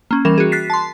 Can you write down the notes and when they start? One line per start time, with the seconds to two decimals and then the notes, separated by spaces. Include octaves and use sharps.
0.11 A#3 C#4
0.25 E3 G3 C#4 A#4 E7
0.38 F#4 G#4
0.52 F#6 A6 B6 C7
0.70 A5 C6